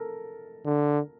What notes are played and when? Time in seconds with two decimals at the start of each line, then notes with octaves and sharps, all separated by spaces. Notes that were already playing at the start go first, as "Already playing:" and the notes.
Already playing: A4 A#4
0.65 D3